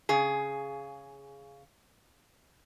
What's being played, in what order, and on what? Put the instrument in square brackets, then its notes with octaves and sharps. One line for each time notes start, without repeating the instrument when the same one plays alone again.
[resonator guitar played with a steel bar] C#3 G#4